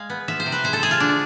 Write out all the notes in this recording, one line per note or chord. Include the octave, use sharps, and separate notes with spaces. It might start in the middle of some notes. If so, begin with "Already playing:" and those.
Already playing: G#3 F5
B3
F3 E5
C5
C3
B4
G#3 C5
A4
G#3 G#4
F4
D3 D4